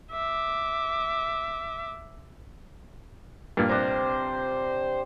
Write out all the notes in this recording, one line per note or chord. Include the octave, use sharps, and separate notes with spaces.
E5 D6
G2 A#2
C3 D4 C5 A#5